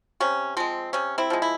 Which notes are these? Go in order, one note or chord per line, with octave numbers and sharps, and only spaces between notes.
C3 C#4
F3 G#3 C4
C3 C#4
C4 E4
F3 G#3
E4